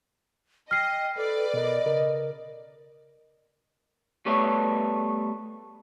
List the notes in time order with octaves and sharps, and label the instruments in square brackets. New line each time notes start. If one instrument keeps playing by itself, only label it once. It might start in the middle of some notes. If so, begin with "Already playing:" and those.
[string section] D#5 [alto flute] G5 [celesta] F6 C7
[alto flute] A4 [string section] B4 D5
[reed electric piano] B2 A#4 [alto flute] D#5
[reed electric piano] C#3 A#4
[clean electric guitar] G3 A3 B3 A4 B4 C#5